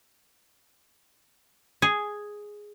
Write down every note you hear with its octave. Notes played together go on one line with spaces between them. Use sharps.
G#4